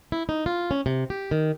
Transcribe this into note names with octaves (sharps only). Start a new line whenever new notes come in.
E4
D#4
F4
C#4
C3
G4
D#3